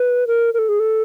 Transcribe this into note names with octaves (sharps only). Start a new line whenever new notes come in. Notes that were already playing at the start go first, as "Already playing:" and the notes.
Already playing: B4
A#4
A#4
A4
G#4
A4